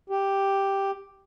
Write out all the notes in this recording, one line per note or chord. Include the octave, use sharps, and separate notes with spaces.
G4